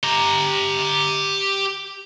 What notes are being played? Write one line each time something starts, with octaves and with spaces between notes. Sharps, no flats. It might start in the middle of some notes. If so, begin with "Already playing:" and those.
G4 A#5